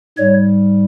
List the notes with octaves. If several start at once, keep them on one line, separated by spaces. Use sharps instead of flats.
G#2 G3 C#5